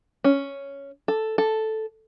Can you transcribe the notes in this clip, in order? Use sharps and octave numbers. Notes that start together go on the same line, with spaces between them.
C#4
A4
A4